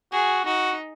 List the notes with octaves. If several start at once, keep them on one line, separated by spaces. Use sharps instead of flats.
F#4 G#4
D#4 F#4